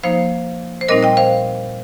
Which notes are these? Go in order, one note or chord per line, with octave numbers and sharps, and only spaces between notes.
F3 A#3 D#4 C5 F5
C5
A#2 G3 C4 D#4 A#4 D#5
D#5 G5
C5 F5